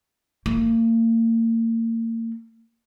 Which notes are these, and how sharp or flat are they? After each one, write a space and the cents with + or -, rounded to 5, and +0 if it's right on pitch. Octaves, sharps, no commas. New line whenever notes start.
A#3 -40